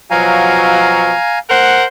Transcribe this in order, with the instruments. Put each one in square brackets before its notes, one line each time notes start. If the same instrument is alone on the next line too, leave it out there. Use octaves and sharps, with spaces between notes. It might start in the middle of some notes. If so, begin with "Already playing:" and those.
[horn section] B2 F3 F#3 [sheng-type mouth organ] F5 G#5 A#5
[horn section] A#4 C5 F#5